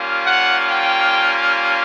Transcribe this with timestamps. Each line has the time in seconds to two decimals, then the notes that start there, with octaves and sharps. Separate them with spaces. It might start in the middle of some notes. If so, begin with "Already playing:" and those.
Already playing: G3 A#3 C#4 F4
0.24 F#5
0.69 G5